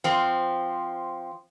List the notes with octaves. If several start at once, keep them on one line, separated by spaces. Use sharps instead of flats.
F3 C4